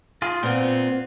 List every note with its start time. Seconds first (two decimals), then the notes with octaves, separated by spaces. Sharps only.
0.22 F4 G#4
0.43 A#2 B3 C4